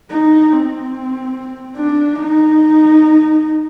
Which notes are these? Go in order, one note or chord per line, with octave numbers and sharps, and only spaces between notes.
D#4
C4
D4
D#4